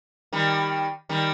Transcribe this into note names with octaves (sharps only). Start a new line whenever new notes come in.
D#3 G3
D#3 G3